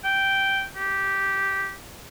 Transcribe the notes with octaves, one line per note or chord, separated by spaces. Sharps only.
G5
G4